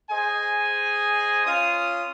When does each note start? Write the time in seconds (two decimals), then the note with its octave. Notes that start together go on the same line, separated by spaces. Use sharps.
0.10 G#4 C5 D#5 G#5
1.46 C#4 F4 F5 D#6